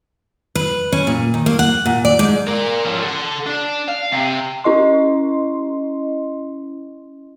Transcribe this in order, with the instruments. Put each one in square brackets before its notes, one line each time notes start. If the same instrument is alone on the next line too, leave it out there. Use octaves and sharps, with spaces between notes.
[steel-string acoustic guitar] B4
C#4
A#2
D#3
A#3
F#5
A#2
D5
G#2
[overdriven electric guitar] A#4 D5
F3 C#4
A4 F#5
D4
F5
C3
[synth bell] C#4 E4 D#5 C6